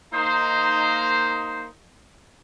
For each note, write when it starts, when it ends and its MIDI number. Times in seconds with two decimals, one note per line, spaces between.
0.13 1.66 58
0.13 1.66 63
0.13 1.66 72